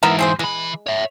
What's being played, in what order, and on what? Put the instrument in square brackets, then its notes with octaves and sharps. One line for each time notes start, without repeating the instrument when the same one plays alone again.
[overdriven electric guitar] G#2 E3 [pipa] B3 A#4 E5
[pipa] C4 G#4 C5
[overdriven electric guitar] E3 B5 [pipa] G#3
[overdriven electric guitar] C#5 E5